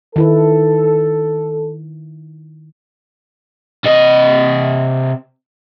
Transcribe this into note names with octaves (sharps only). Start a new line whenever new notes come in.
D#3 E4 A4 B4
C3 D#5